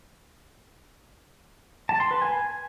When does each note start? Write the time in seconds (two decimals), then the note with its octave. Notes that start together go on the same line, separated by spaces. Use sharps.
1.89 A5
2.00 C6
2.11 B4
2.22 G#5